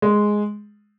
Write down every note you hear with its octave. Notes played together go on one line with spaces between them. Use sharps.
G#3